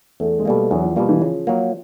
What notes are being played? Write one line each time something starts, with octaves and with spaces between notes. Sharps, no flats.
E2 A3
G#3
B2 G3 A3 A#3
E2 F#3
F3
B2 F3 G3 A#3
E3
C#3 F3
F#3 A#3